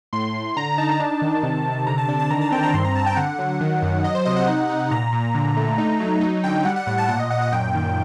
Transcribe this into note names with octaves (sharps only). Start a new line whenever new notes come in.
A2 C6
A2
D3 A#5
D#4 A5
D4
D#3
C3
C3
D3 A#5
A5
D4 A5
A5
D#3 A#5
A5
C4 G5
A#5
G2 C6
A#5
G2 A5
G5
D3 F#5
F#3
D#3
F#2
F#3 D#5
C5
C3 D#5
F#5
D#4
D#4
A#2 A#5
A#2
D3
A3
D#4
F#3
D#4
D3 G5
G3 F#5
F#5
A2 F#5
A5
A#2 F#5
D#5
A#2 F#5
D#5
F#2 G5
D#3